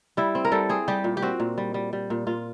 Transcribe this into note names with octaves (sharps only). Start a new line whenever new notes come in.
G3 E4
C4
A#4
G3 A4
C4 G#4
G3 G4
A#2
G4
C4 F#4
A#2
G3
G3
G3
A#2
A#2 F4